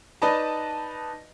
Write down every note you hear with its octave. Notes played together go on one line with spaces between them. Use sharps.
D#4 B4 D5 D#5 A5 B5